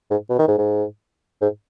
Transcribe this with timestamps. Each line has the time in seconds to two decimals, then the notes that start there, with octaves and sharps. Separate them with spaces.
0.11 G#2
0.29 B2
0.39 D#3
0.48 G#2
0.58 G#2
1.42 G#2